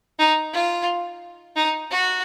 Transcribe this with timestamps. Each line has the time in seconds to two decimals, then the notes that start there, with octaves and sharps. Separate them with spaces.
0.19 D#4
0.53 F4
1.56 D#4
1.91 F#4